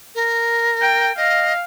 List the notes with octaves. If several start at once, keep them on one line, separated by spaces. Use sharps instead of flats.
A#4
G5
D#5 F5